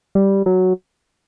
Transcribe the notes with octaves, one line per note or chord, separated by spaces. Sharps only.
G3
F#3